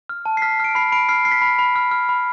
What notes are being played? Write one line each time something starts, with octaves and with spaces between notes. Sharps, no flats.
F6
A5
C7
F6 B6
F6 D7
B5 C7
B5 D7
F6 C7
F6 C7
B6
B5
B5
F6
F6
B5